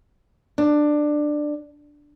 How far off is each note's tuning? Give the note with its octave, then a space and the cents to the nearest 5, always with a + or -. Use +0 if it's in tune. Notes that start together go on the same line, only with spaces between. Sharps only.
D4 +15